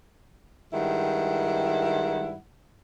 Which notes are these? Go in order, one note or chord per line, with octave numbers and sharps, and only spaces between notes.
G2 D#3 G#3 E4 F#5